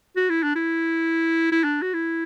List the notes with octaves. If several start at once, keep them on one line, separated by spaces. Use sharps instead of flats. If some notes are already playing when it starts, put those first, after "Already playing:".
F#4
E4
D4
E4
E4
D4
F#4
E4